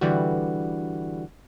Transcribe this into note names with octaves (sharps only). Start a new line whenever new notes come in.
D3 E3 G3 F#4